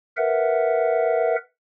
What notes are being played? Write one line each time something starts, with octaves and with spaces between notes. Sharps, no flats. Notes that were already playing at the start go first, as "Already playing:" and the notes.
A#4 B4 E5 F#5